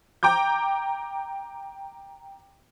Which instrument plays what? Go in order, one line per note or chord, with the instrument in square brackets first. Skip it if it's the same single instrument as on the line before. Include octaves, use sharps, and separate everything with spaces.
[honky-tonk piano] G5 A#5 D6 G6